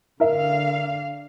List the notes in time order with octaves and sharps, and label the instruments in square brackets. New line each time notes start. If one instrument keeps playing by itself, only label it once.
[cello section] D3 F5 [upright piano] A#4 E5